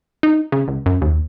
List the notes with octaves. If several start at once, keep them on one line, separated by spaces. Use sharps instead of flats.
D#4
C#3
C#2
F#2
D#2